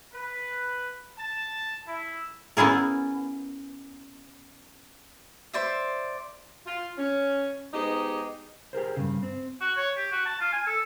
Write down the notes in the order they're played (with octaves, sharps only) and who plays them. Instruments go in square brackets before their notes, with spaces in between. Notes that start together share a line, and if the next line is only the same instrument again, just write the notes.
[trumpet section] B4
A5
E4
[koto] B3 C#4 E4 G#4 A#4
[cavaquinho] C5 D5 E5
[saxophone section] F4
C#4
G#3 B3 D#4 G4 C5 D#5
[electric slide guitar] G4 G#4 A#4 C5
G2 C#3
C4
[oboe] F#4
C#5
G4
F#4
A5
F4
G#5
A4